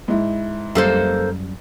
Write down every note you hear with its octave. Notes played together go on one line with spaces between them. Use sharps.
G#2 E4
F#2 G3 A#3 A4 C5